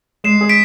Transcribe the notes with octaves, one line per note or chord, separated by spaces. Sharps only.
G#3 C7 E7
G#4
B6 D7